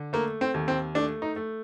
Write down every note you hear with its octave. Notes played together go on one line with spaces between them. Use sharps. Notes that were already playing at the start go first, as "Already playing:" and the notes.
Already playing: D3
A3 A#3
C4
D#2
C4
A3 D4
D#4
A3